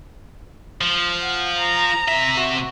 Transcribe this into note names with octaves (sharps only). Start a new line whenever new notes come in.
F3
F#5
A#5
C3 E5
F#4